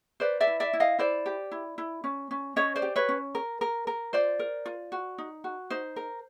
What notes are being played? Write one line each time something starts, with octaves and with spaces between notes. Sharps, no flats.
B4 C5 D5
D5 E5
E4
D5 E5
E4
D#5 F5
E4 C5 D5
G4
E4
E4
C#4
C#4
C#4 C#5 D#5
C5 D5
G4
B4 C#5
C#4
A#4
A#4
A#4
F4 C5 D5
A#4
F4
F#4
D#4
F#4
D#4 C5
A#4